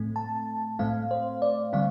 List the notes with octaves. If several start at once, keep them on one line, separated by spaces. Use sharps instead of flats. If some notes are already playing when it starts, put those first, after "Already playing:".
Already playing: A2 A3 C4
A5
A2 A3 C4 F5
C5
D5
D3 G3 C4 F5